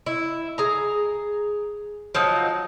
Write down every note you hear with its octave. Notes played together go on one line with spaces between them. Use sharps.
E4
G#4 A#5
F3 F#3 D#4